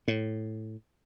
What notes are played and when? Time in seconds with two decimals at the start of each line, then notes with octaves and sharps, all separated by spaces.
0.08 A2